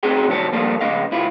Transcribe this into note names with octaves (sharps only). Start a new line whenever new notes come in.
C4 C#4 D#4 F#4 G#4 G5
C3 D#3 F#3 G3 C#5 A5
A#2 F3 G3 A#3 F4 A4
F2 C#3 A3 C4 D#5 F5
C#2 E4 F4